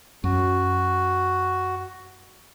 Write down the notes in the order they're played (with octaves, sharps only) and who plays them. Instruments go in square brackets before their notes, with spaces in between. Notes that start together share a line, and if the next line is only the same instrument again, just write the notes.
[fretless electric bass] F#2 [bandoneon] F#4